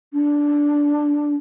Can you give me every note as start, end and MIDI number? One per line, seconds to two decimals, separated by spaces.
0.13 1.34 62